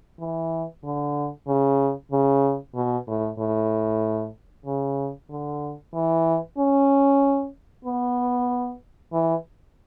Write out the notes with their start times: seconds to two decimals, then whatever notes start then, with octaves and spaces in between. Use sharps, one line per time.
0.20 E3
0.84 D3
1.47 C#3
2.12 C#3
2.75 B2
3.07 A2
3.39 A2
4.66 C#3
5.29 D3
5.94 E3
6.58 C#4
7.85 B3
9.12 E3